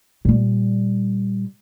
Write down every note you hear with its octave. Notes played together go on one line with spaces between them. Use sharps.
A#2 G3